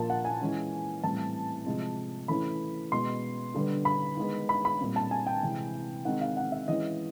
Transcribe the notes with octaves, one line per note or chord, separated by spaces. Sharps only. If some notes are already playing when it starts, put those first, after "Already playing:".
Already playing: A#2 F3 A#3 A5
F#5
G#5
E3 G#3 C#4
A2 E3 G3 C4 A5
C3 F3 G#3 C4
E3 A3 C#4 B5
B2 G#3 B3 C6
D3 G3 B3
B5
D#3 G#3 B3
B5
B5
A#2 G3 C4
A5
G#5
G5
C3 E3 G#3
D#3 G#3 C4 F#5
F5
F#5
E5
E3 G#3 C#4 D#5